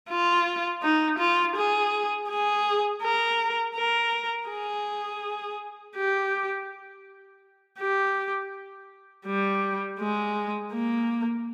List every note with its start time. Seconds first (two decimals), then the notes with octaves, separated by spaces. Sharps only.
0.10 F4
0.83 D#4
1.19 F4
1.56 G#4
2.29 G#4
3.03 A#4
3.76 A#4
4.49 G#4
5.96 G4
7.80 G4
9.26 G3
10.00 G#3
10.73 A#3